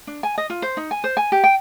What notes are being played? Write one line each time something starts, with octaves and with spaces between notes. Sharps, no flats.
D4
G#5
D#5
F4
C5
D#4
G#5
C5
G#5
G4
G5